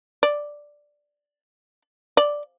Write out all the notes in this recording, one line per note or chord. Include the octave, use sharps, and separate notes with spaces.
D5
D5